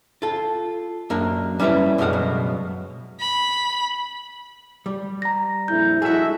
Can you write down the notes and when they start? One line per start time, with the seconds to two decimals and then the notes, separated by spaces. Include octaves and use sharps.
0.22 F4 A4
1.10 F#2 A#3 D4
1.60 G3 C#4 E4 A4 B4 E5
1.98 C#2 F#2 B2 D3 F5 F#5
2.13 C#2 F#2 B2
3.19 B5
4.86 G3
5.22 A#5 A#6
5.68 A#1 F2 E4 G6
6.02 G#3 E4 F#4 G#4 A4 E5